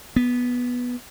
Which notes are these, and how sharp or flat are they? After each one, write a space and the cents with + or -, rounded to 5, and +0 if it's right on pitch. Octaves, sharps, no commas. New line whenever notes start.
B3 -10